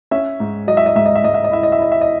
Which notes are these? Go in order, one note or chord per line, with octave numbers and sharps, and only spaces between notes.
C#4 E5
G#2
F#3 D#5
E5
D#5
G#2 E5
D#5
E5
G#2 D#5
E5
D#5
E4 E5
D#5
E5
E4 D#5
E5
D#5